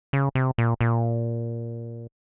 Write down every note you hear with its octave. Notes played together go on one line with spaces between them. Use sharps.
C#3
C3
A#2
A#2